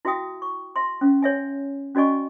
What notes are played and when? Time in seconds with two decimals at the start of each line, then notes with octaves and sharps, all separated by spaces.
0.05 E4 F#4 E5 F5 G5 D#6
0.42 C#6
0.76 E5 C6
1.01 C#4 F5
1.22 C#5 E5 G#5
1.95 C#4 F#4 D5 D#5 G#5 C#6